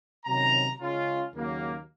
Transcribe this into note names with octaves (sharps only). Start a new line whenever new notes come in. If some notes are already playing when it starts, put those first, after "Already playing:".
C3 D#3 F#3 C#4 A#5
C#3 G#3 C#4 F4
D#2 C#3 F#3 A#3